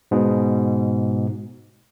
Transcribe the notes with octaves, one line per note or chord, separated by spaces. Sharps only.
G#2 B2